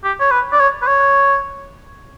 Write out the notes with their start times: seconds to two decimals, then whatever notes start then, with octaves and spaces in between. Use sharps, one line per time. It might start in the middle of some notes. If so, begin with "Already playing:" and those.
0.04 G4
0.20 C#5
0.31 B4
0.52 D5
0.60 C#5
0.82 B4
0.87 C#5